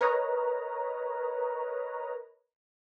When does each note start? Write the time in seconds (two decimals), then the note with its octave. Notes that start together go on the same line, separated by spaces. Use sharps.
0.01 A#4 B4 C#5 D#5 A#5